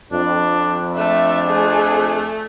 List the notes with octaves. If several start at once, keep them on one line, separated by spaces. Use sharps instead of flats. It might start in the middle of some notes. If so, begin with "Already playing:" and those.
F2 D4
A3 D4 E5
A3 G#4